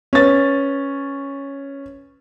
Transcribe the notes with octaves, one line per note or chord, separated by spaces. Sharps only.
C#4 B4 A6